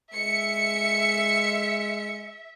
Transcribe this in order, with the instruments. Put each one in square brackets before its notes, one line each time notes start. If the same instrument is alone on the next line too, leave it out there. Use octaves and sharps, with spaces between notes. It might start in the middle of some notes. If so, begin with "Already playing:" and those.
[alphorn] G#3 [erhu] E5 [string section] C#7